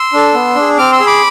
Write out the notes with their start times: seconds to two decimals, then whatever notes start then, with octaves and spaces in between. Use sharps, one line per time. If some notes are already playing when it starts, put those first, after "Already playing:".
Already playing: C6 E6
0.13 D4 A4
0.34 B3
0.55 D4
0.61 G#4
0.78 C4 D6 F6
0.92 C6 E6
1.00 G#4
1.06 B5 D6